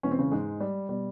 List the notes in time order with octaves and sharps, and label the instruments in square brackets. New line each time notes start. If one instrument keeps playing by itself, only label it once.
[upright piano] E1 E2 B2 C#4
C4
C#3 C#4
G#2 G#3
G3
B2 G3